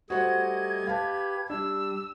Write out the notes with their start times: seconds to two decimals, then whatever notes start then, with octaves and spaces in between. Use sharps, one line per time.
0.10 G3 A3 F#4 C5 D#5 F#5 G#6
0.87 G4 B4 F5 A5
1.50 G3 D4 E6